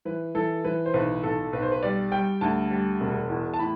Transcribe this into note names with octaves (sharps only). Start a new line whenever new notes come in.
E3 B4
E3 A4
E3 B4
C5
B1 B4
B1 A4
B1 B4
C5
B4
G3 D5
G3 G5
D2 A5
G3
E1
E2
A5
A2 B5